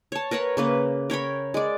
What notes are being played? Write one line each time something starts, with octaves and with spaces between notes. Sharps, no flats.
C#5 A5
A#4 B4 C#5 F#5
C#3 A#3 B4
A#4 C#5 G5 B5
G#3 D5